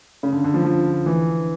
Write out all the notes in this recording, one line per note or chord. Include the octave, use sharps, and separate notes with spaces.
C#3
D3
D3
F3
F3
E3